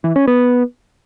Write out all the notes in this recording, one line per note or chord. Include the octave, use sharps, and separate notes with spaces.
E3
C#4
B3